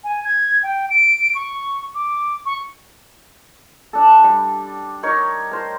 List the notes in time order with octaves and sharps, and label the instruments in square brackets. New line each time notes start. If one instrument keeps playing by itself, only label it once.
[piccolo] G#5
G#6
G5
D7
C#6
D6
C#6
[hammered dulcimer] D4 A4
G3
D#4 A#4 C#5
A#4 C5